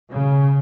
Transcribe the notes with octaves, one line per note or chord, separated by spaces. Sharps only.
C#3